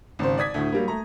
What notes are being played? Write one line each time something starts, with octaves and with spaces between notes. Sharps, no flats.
G#1 C#3 C5
D5 D#6 G#6 B6
D2 A2
F#3 G3 A#3
A3 A#5